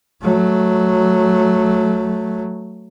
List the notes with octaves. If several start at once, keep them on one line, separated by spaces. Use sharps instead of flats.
F#3 A3